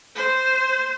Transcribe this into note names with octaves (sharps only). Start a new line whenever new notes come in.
C5